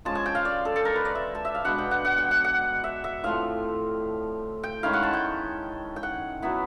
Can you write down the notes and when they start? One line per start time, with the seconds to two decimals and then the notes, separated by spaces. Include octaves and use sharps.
0.05 F3 G#3 C#4 A5
0.15 G#5
0.26 G5
0.35 F5
0.45 D5
0.65 A4
0.76 A4
0.85 A#4
0.96 B4
1.05 D5
1.15 E5
1.35 A5
1.45 E5
1.55 F5
1.65 B2 G#3 B3 D4 F#5
1.78 G5
1.91 F#5
2.05 F#5
2.18 G5
2.31 F#5
2.44 F#5
2.84 E5
3.04 E5
3.24 A2 F3 A3 C4 F5
4.63 G5
4.83 D#3 G#3 C#4 E4 F5
4.93 F#5
5.03 A5
5.13 G5
5.96 G5
6.03 F#5
6.42 F#3 B3 E4